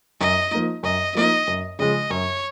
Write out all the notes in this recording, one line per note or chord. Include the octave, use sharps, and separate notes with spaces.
F#2 D#5
F3 A#3 D#4
F#2 D#5
F3 A#3 D#4 D#5
F#2
C#3 F3 G#3 D#5
F#2 C#5